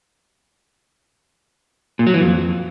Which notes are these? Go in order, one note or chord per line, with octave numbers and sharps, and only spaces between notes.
A#2
F#3
E3
F2